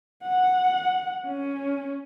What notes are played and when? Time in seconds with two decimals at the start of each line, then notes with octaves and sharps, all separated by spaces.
0.22 F#5
1.27 C#4